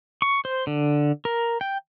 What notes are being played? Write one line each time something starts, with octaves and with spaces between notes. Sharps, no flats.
C#6
C5
D3
A#4
G5